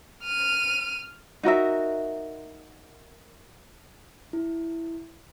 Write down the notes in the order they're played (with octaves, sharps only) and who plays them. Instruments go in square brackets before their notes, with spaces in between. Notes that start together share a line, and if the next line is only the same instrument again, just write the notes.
[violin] F6 D#7
[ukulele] D#4 F#4 A#4 E5
[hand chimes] E4